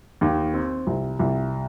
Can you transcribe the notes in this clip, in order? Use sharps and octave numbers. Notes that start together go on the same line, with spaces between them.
D#2
C4
C2
C2